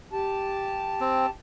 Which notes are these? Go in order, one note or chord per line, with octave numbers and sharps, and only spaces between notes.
G4 A5
C4